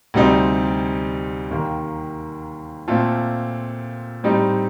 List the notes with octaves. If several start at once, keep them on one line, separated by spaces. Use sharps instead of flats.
D2 C3 G3 C4 D#4
D#2 D#3 A#3
A#2 A3 C4 F4 A4
A2 G3 C4 D#4